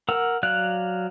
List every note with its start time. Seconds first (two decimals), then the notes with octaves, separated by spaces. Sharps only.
0.09 A#4 F#5 E6
0.43 F#3 D5 F5 F#6